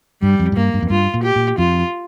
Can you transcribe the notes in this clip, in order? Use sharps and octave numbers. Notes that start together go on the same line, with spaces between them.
G2 G3
F2
G#2
G2 A#3
G2
F2
G2 F4
A#2
G4
A#2
F2 F4